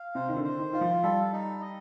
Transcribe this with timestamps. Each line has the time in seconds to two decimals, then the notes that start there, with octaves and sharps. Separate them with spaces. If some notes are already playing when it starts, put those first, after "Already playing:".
Already playing: F5
0.15 C3 C5
0.29 D#3
0.36 D3
0.44 C5
0.59 D#3
0.73 D#3 F4
0.81 F3
1.03 G3 A4
1.32 D#4
1.62 D#5